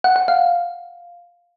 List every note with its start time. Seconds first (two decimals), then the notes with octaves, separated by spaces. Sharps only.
0.04 F#5
0.16 F#5
0.28 F5